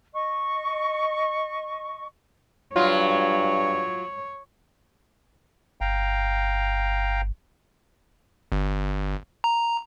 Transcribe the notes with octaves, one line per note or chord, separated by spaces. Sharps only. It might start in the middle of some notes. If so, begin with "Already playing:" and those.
D#5 C#6
G2 F#3 F4 C#5
G1 F5 G5 A#5
G1
A#5